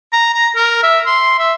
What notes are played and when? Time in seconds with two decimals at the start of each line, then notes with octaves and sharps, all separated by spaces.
0.13 A#5
0.34 A#5
0.56 A#4
0.83 E5
1.06 C6
1.39 E5